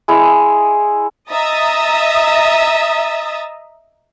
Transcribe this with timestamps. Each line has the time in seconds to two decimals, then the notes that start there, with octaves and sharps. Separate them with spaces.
0.08 G#3 E4 D#5 E5
1.31 D#5 E5 A#5 D#6 A6